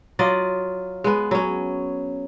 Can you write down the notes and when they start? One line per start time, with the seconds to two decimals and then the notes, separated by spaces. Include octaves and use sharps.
0.19 F#3 F4 D5 D#5
1.04 G#3 B3
1.31 F#3 C#4